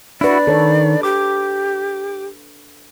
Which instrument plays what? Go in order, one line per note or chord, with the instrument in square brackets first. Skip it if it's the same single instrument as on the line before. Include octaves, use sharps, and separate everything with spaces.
[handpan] D4 B4 [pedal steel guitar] E4 F#4 [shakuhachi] D5
[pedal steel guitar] D#3 [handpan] A4 C#5
[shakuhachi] G4 [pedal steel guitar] D6